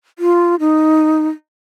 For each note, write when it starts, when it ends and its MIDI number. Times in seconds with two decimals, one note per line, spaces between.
0.19 0.55 65
0.60 1.27 63